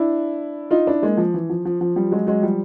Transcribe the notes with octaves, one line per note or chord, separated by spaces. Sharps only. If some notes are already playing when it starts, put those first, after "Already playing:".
Already playing: D4 E4
D#4 F4
D4 E4
G#3 A#3
F3
E3
F3
F3
F3
F3 G3
F#3 G#3
F#3 G#3
F3 G3